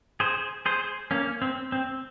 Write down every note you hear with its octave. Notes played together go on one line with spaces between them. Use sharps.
G#4 C5
G#4 C5
A#3 C#4
C4
C4